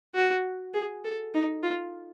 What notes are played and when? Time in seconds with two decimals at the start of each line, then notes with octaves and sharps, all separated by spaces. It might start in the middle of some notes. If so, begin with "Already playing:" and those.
0.15 F#4
0.74 G#4
1.05 A4
1.34 D#4
1.63 F4